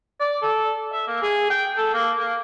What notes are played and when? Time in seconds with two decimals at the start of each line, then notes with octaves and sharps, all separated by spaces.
0.20 D5
0.42 A4
0.93 E5
1.08 A#3
1.22 G#4
1.50 G5
1.77 A4
1.94 A#3
2.18 A#3